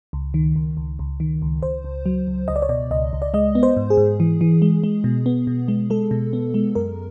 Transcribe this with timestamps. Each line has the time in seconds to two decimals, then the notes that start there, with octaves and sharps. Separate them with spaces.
0.13 C#2
0.34 D#3
0.56 C#2
0.77 C#2
0.99 C#2
1.20 D#3
1.42 C#2
1.63 C#2 C5
1.84 C#2
2.06 F#3
2.28 C#2
2.48 C#2 D#5
2.56 D5
2.62 C#5
2.69 B2 D5
2.91 C#2 D#5
3.13 C#2
3.22 D5
3.34 G#3 D#5
3.55 B3
3.63 C5
3.77 G#2
3.90 G#4
3.97 G#2
4.20 E3
4.41 E3
4.62 G#3
4.84 G#3
5.04 B2
5.26 B3
5.47 B2
5.68 G#3
5.90 G#3 A4
6.11 B2
6.33 B3
6.54 G#3
6.75 F#2 A#4